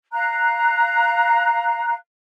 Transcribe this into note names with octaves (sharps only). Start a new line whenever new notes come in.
F5 A#5 F#6